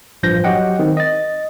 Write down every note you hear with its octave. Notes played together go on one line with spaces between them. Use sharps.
A1 G2 F3 G6 A#6
F#3 F#4 G4 D#5 F#5 G5
D#3 C4
D#5 A6